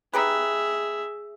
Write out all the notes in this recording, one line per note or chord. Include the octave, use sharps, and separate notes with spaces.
D#4 G4 G#4 B4 E5